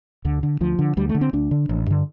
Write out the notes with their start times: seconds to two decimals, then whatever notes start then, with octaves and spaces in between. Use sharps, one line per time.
0.25 D2 D3
0.43 D3
0.61 D2 F3
0.79 D3
0.97 D2 G3
1.09 A3
1.15 D3
1.21 C4
1.33 D2 D4
1.51 D3
1.69 A1
1.87 G2 D3